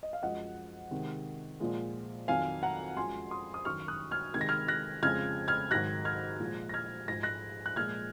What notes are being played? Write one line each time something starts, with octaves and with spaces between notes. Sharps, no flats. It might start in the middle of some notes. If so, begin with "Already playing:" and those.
D#5
F5
F#2 F3 G#3 D#5 F#5
C3 D#3 G#3
A#2 F3 G#3
F2 D#3 F#3 F5 G#5
F#5 A#5
F#2 F3 G#3 G#5 C6
C6 D#6
D#6
F#2 D#3 F#3 C#6 F6
D#6 F#6
F6 G#6
C3 D#3 G#3 G#6
A#6
F6 G#6
F#6 A#6
F2 C#3 F3 G#3 F6 G#6
F6 G#6
G#2 D#3 F#3 F#6 A#6
F6 G#6
A#2 F3 G#3
A#6
F6 G#6
G#2 F3 G#3 A#6
F#6 A#6
F#6
A#2 F3 G#3 F6 G#6